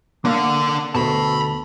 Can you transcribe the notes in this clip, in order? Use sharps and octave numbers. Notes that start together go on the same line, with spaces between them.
D3 A#3 D4 F5
D2 G2 B2 A4 A5 B5